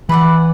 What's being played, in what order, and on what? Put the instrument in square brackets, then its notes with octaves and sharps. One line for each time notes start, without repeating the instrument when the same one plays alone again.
[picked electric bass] E3 [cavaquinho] B4 D5 F#5